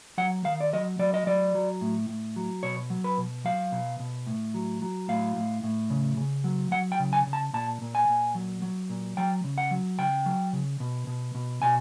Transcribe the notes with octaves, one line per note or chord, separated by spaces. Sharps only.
F#3 F#5
D#3 F5
D5
F#3 D#5
F#3 D5
D#5
F#3 D5
F#3
A2
A2
F#3
B2 C#5
F#3
B4
B2
F#3 F5
B2
B2
A2
F#3
F#3
A2 F5
A2
A2
C#3
C#3
F#3
F#3 F#5
G5
C#3
G#5
C#3
A5
A#2 A5
A#2
G#5
A#2
F#3
F#3
A#2
F#3 G5
C#3
F#5
F#3
C#3 G5
F#3
C#3
B2
B2
B2
B2 G#5